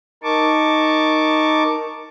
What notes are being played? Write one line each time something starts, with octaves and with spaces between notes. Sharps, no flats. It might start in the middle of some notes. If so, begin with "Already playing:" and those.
D#4 A#4 A5 C#6 D6